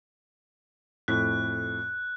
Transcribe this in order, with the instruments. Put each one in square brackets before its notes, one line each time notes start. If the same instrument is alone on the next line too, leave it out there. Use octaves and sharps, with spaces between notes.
[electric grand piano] F2 A2 B6 [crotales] F#6